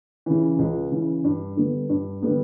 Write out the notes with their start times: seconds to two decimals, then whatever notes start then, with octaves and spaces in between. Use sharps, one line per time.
0.26 C#3 E3
0.59 C#2
0.92 C#3 E3
1.24 G2
1.57 D3 G3 B3
1.89 G2
2.22 D3 G3 B3